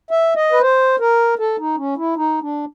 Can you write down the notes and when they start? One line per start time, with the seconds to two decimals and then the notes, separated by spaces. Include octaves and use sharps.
0.11 E5
0.36 D#5
0.52 B4
0.61 C5
1.00 A#4
1.39 A4
1.59 D#4
1.77 C#4
1.97 E4
2.16 D#4
2.42 D4